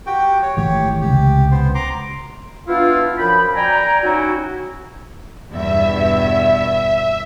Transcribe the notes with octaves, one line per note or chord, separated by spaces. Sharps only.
F#4 G4 G5
C#5
G#1 E3 A3 G4 C#5
C#2 C3 G4
B3 C5
A#5 C6 D6
B3 D4 E4 F4
F#2 F3 G5 B5
D5 G5 G#5 A#5
C#4 D#4 E4 F#4
E2 G2 B2 E5